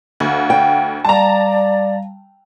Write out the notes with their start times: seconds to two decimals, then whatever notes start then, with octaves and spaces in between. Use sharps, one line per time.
0.20 D2 F5 F#5
0.50 G5
1.05 G3 D5 F5 A5 A#5